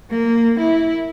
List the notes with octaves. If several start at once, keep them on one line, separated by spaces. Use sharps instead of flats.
A#3
E4